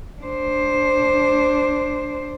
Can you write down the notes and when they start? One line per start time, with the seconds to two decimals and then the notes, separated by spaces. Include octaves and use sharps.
0.22 D4 C5